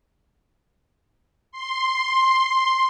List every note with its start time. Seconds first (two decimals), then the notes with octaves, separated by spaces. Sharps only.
1.52 C6